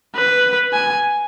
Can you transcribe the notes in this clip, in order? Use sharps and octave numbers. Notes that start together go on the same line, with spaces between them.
B4
G#5